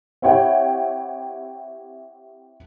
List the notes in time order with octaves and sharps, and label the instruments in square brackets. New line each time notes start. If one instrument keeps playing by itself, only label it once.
[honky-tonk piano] C4 E4 G4 C#5 F#5 G5